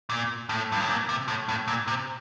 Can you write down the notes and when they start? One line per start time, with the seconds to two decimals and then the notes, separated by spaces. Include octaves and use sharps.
0.10 A#2
0.49 A2
0.72 G2
0.81 A2
0.89 A#2
1.09 C3
1.28 A2
1.49 A2
1.68 A#2
1.88 C3